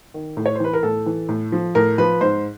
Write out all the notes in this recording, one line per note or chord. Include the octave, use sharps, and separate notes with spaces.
D#3
A2
C#5
C5
E3 B4
A#4
A2 A4
E3
A2
F3
A2 A#4
F3 B4
G#2 C5